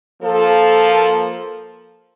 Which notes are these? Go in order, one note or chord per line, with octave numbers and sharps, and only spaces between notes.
F3 A#3 A4